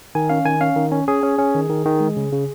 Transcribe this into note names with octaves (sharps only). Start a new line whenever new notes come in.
D#3 G#5
C#4 F5
D#3 G#5
C#4 F5
D#3
C#4
C#4 G#4
C#4
C#4
D#3
D#3
D#3
G#3
C#3
C#3